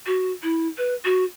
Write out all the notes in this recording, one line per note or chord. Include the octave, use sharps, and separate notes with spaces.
F#4
E4
B4
F#4